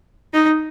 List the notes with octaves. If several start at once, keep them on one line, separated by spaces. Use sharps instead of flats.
D#4